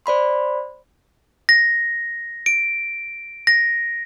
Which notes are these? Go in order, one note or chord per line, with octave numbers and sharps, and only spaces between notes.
C5 D5 B5 C6
A#6
D7
A#6